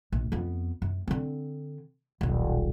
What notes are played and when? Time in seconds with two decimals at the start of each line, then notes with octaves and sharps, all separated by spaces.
0.12 A#1
0.32 F2 B3
0.82 F#2
1.08 D3 C4
2.21 D#1 B1